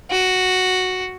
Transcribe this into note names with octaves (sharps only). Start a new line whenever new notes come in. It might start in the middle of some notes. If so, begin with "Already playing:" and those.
F#4